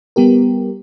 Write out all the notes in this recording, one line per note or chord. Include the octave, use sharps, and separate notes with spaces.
G3 B3 G4 A#4